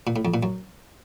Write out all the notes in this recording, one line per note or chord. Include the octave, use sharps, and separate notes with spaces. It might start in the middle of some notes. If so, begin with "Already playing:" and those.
A#2
A2
F2
A#2
F#2